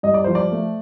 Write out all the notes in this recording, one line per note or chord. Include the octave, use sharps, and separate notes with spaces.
G2 D#5
D5
F3 C5
D5
A3